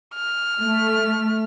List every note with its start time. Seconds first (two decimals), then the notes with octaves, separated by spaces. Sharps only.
0.15 F6
0.61 A3